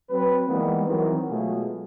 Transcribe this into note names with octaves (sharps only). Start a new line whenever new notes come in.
F#3 C4 B4
D#3 E3 G3 G#3 A#3 B3
D#3 E3 F#3 C4 A#4
B2 F#3 G#3 A3 F4 G#4